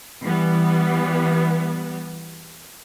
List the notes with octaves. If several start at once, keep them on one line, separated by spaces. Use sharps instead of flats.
E3 G3 B3